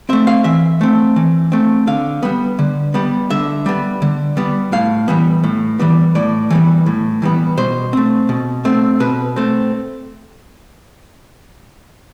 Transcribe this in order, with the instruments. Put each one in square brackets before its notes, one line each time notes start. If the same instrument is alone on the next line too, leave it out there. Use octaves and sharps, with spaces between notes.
[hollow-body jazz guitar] A3 C4 E5
F5
E3 E5
A3 C4
E3
A3 C4
D3 F5
G3 B3
D3
G3 B3
D3 E5
G3 B3
D3
G3 B3
A2 F5
E3 G3 B3
A2
E3 G3 B3
A2 D5
E3 G3 B3
A2
E3 G3 B3
B2 C5
A3 C4
B2
A3 C4
B2 B4
A3 C4